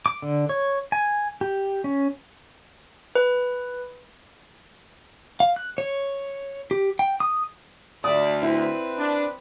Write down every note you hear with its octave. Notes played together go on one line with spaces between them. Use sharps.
D6
D3
C#5
G#5
G4
C#4
B4
F5
F#6
C#5
G4
G5
D#6
D2 D5 E5 D#6
C4 E4 B4
D4